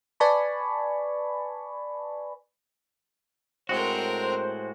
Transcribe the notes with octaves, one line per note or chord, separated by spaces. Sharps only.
B4 D5 G#5 A5 B5 C#6
A2 G#3 C4 F#4 A#4 C5